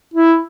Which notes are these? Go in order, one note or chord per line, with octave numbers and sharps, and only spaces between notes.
E4